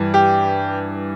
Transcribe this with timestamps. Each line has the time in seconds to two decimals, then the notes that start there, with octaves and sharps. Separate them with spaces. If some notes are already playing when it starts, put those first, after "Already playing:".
Already playing: G2 E3
0.14 G4